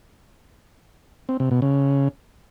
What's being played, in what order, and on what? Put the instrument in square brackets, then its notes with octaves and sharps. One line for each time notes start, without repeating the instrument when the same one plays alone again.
[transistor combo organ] C4
C3
B2
C#3